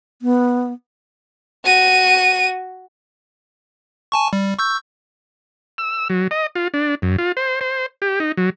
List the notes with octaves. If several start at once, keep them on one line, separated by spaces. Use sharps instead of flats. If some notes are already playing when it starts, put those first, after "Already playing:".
B3
F#4 D#7
G#5 A5 C#6
G3
C#6 E6 G6
E6
F#3
D#5
F4
D4
F#2
F4
C5
C5
G4
D#4
F#3